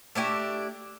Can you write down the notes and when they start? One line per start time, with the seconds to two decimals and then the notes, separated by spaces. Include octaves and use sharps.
0.15 A3 D4 E4 G4